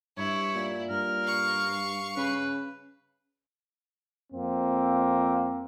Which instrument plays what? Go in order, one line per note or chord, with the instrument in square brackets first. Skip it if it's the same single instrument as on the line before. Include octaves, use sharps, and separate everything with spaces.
[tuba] G2 [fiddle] E4 [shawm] C#5
[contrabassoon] A#2
[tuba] G2 [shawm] A#4
[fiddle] F5 C#6
[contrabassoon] C#3 [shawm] B4
[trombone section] F2 A#3 C4